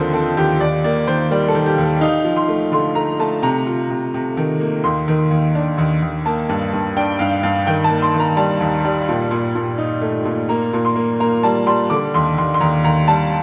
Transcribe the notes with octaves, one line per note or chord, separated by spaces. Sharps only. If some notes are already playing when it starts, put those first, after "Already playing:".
Already playing: D#2 D3 F3 C4 A#4 C5
C4 A4
D#2 G4
D#2 D5
A#3 D5
D#3 C5
G3 A#4
A4
D#3
G4
D#2
A4
D#4 F5
F3
C6
A3
D3 C6
A3 A#5
A3 A5
C3 A#5
F4
C3
C3
D#3
A#3
D#2 C6
D#3
D#2
D4
D#2
D#2
A#3 A5
G2
G2
D4 G5
G2 F5
G2 F5
D#3 G5
A5
A#3
C6
D#3
A#5
G3 A5
D#2
G3
A#2
A#2
A#2
D#4
A3
A#2
A#3 A#5
A#2
C6
A#3
A#3 A#5
G3 A5
G3 C6
D3 D6
D#2 C6
D#2 C6
C6
D#2 A#5
D#2 A#5
G3 A5